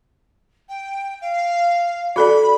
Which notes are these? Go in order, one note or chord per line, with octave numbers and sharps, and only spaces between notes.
G5
F5
F#4 A4 D5 B5